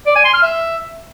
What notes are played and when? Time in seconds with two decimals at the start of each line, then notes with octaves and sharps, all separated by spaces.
0.07 D5
0.15 G#5
0.24 C6
0.33 F6
0.42 E5